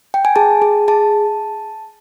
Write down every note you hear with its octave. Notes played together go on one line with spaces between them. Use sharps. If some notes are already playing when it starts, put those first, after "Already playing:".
G5
G#5
G#4 A5
G#4
G#4 A5